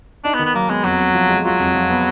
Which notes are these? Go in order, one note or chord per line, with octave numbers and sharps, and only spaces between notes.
D4 D#4
B3
D#3
B3
F#3 A#3
G#3 B3
F2 F#3
F2
F3
G#3
F#3 F4
F2
F3
B3